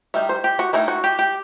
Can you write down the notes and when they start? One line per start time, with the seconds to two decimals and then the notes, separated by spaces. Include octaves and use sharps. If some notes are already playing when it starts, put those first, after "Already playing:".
0.14 D#3 G3 D#4 E5
0.29 C5
0.44 G4
0.59 F#4
0.73 D#3 A3 D#4 E4
0.88 F#4
1.04 G4
1.19 G4